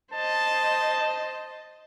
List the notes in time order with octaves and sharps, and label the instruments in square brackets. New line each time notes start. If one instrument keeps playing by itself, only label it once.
[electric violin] C5 D#5 [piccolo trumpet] A5